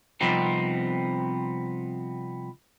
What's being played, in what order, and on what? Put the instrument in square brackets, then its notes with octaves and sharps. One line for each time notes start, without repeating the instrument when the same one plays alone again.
[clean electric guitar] C3 F3 G3 B3 C4 D#4